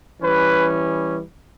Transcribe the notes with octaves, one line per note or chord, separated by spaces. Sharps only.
E3 G3 C#4 B4